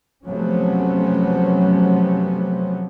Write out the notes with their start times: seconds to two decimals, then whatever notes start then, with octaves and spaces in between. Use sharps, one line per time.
0.25 C3 F3 F#3 A3 B3 C#4